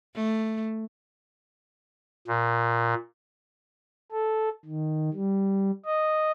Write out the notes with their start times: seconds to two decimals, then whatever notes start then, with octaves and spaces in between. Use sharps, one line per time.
0.15 A3
2.27 A#2
4.12 A4
4.65 D#3
5.14 G3
5.85 D#5